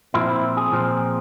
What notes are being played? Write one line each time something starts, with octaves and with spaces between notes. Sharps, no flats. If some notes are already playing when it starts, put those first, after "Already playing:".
A#2 F3 C4 E4
E4
G#4
A#2 F3 C4